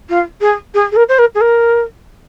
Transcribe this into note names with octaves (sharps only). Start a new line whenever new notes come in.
F4
G#4
G#4
G#4
A#4
C5
A#4
G#4
A#4